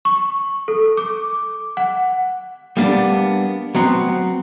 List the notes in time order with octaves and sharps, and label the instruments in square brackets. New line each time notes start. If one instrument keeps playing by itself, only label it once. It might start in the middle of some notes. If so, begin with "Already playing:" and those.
[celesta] C#6
A4
D6
F#5
[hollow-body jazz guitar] G3 A#3 B3 D4
F#3 B3 C4